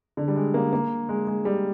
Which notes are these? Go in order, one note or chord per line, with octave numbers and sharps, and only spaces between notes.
D3
G3
G#3
A#3
A#3
G#3
G#3
G3